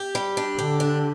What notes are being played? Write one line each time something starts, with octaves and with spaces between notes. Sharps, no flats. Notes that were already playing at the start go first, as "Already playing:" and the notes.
Already playing: G4
G3
D4
D3 G4
D4